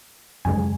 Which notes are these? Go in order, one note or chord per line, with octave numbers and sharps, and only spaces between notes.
F#2 C#3 G#3 G#5